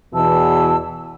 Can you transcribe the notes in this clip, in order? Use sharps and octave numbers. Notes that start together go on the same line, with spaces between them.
E2 B2 E3 A5 E6